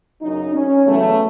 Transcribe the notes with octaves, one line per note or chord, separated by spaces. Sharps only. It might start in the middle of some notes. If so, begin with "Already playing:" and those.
F#2 C#3 F#3 D#4
C#4
E2 C#3 F#3 A3